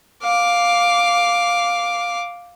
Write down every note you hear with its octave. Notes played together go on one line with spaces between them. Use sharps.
F5 D6